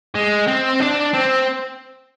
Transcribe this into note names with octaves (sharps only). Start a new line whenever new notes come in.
G#3
C4
D4
C4